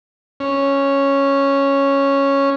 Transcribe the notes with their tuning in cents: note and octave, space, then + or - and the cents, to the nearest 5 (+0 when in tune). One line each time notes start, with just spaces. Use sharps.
C#4 -5